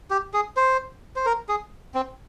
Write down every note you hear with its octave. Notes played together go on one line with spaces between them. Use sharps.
G4
G#4
C5
C5
A#4
G#4
C4